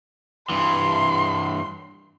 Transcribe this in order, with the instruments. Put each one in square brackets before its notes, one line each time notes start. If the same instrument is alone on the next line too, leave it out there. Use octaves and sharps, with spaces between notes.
[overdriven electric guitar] G2 E3 [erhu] C6